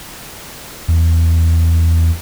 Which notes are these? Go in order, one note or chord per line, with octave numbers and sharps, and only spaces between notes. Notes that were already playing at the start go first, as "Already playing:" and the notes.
E2